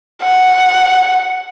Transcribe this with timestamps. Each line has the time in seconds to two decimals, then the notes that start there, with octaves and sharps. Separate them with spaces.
0.22 F#5